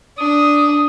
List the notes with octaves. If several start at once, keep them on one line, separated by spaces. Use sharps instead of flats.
D4 D#6